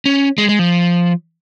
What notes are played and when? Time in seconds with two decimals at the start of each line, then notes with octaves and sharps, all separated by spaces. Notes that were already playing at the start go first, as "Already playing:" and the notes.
0.06 C#4
0.38 G#3
0.49 G#3
0.59 F3